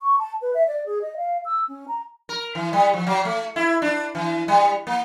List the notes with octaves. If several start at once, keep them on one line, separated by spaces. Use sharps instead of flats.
C#6
A5
B4
E5
D5
G#4
D#5
F5
E6
C#4
A#5
A#4
E3
G3
F3
F#3
A3
E4
D4
E3
G3
A#3